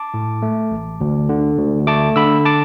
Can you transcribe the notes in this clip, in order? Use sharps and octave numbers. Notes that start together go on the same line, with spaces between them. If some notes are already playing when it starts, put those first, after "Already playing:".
Already playing: A5 D6
A2
A3
A1
D2
D3
D2
A3 A5 D6
D3 B5 E6
A5 D6